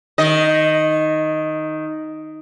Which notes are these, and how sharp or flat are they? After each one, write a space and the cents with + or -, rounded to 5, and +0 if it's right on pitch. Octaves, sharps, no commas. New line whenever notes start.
D#3 +0 D#5 +0